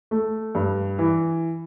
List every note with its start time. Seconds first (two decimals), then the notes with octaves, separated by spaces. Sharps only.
0.11 A3
0.55 G2
0.99 E3